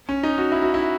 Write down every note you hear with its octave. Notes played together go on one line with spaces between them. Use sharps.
C#4
D#4
F#4
E4
F#4
E4